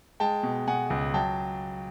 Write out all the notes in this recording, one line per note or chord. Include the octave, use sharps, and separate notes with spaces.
G#3 G5 A5
B2
B2 F#5 G#5
C#2
F#3 G5 A5